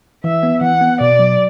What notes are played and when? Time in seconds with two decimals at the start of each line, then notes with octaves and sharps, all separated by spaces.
0.24 E3 E5
0.43 B3
0.61 E3 F#5
0.81 B3
1.01 B2 D5
1.19 F#3